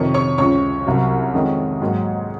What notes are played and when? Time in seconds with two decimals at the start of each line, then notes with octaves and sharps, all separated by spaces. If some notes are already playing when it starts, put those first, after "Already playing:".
Already playing: F2 C3 D#3 C#5 C#6
0.14 C#5 C#6
0.38 C#2 C#3 F3 C#5 C#6
0.86 C2 C3 F#3
1.34 F2 D#3 G#3 C4
1.82 G#2 F#3 A#3